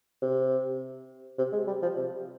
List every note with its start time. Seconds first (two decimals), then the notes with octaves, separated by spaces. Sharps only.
0.22 C3
1.38 C3
1.52 G#3
1.67 G3
1.82 F3
1.96 C3